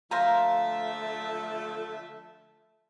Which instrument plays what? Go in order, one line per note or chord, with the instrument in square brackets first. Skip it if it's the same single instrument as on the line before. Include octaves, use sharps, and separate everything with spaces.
[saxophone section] D3 F3 A3 [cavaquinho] C5 F5 A#5 [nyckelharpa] E5 A5